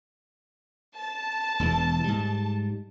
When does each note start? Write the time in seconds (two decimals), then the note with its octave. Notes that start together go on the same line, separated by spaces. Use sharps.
0.95 A5
1.60 E1 E2 E3
2.04 G#2 G3